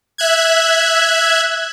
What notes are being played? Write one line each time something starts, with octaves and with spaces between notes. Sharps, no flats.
E5 F#6 G#6